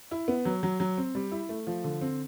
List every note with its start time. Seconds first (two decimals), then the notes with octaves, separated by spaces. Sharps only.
0.11 E4
0.28 B3
0.45 F#3
0.63 F#3
0.80 F#3
0.97 C4
1.15 G3
1.32 E4
1.49 A3
1.67 F3
1.84 D3
2.01 C4